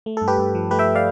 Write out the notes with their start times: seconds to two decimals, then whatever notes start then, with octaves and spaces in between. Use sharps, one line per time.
0.06 A3
0.17 G2 A4
0.28 G4 B4
0.38 G2
0.55 F3
0.71 A3 G4 B4
0.79 E5 G5
0.95 D5 F5